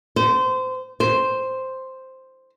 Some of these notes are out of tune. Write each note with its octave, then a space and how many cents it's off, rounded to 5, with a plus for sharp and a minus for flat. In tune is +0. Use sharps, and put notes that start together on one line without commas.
C5 -25
C5 +0